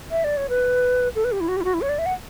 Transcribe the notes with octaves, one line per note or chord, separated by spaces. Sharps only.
E5
D5
C#5
B4
A4
B4
G4
E4
F#4
G4
E4
F#4
E4
C#5
D5
E5
F#5